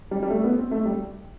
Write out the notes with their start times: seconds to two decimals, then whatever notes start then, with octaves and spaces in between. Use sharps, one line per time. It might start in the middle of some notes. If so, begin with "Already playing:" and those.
0.11 G3
0.23 G3
0.30 A3
0.44 B3
0.58 C4
0.71 A3
0.85 G3